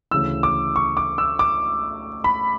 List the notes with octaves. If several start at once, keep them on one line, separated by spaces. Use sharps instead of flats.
D2 C#3 E3 E6
D6
C#6
D6
E6
D6
B5